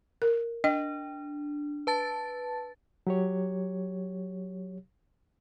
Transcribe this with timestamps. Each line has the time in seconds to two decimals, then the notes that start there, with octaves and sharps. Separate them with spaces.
0.22 A#4
0.64 D4 D#5
1.87 B4 A5 A6
3.07 F#3 G4 C#5